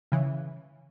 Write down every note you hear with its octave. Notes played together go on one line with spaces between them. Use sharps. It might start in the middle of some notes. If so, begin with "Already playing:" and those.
C#3 E3